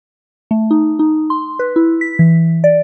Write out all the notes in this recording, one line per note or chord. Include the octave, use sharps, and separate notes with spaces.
A3
D#4
D#4
C6
B4
E4
B6
E3
D5